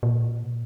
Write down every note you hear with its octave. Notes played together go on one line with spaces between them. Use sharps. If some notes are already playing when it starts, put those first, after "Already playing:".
A#2